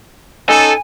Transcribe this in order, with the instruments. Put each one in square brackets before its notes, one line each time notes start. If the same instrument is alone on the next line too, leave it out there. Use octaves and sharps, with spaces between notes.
[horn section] C#4 D#4 A4 [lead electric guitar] G#5